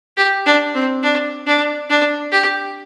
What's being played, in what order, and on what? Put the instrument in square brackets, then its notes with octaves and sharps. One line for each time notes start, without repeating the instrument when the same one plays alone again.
[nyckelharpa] G4
D4
C4
D4
D4
D4
G4